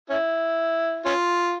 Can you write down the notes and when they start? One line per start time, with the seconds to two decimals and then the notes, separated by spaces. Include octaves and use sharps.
0.10 C#4 E4
1.05 C#4 F4